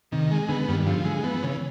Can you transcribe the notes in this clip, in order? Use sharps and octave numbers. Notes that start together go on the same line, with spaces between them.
C3 D#3
G#3
D3 B3
G2 D#3
D3 F3
D3 G#3
E3 B3
C#3 E3